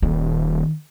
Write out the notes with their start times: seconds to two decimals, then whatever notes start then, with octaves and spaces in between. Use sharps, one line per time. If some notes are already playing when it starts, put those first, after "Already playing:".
0.02 D#1 D#3